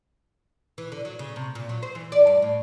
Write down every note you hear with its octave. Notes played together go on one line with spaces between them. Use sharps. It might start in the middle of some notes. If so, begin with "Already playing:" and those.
E3
D3
F#3
C#3
C3
A#2
F#3
C5
E3
D5
G2
A2